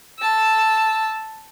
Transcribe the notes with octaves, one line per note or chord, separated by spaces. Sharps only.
A5 E6